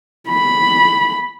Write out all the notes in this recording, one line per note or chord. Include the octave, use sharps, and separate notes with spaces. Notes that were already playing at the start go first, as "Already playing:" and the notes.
B5